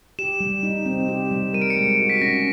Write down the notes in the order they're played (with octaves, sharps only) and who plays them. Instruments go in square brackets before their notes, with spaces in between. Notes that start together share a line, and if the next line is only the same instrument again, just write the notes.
[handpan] G4 [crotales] E7
[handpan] G3
D#4
C4
G4
G3
[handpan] A#4 [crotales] D#7
[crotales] D7
C#7
[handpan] G#3 [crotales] D7
[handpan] F#4
[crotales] B6
[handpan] C#4 [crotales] A#6